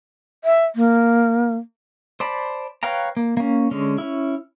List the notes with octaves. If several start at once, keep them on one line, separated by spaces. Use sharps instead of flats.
E5
A#3
C5 D5 A5 B5
B4 C#5 F5 G5 A#5
A#3
A#3 C#4
D3 G#3 C#4
C#4 E4